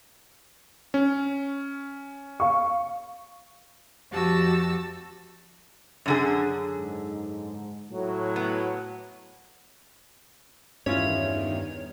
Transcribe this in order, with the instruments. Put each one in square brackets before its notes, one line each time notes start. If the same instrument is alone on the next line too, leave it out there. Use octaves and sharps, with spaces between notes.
[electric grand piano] C#4
[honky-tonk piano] F5 C#6
[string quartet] F2 F#4 G4 A5 E6
[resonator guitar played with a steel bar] F#2 D3 G#4
[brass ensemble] G#2
A2 F#3
[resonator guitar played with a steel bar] B3
[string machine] E2 D#3 [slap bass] G2 [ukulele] C#4 E4 F4 [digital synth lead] C#5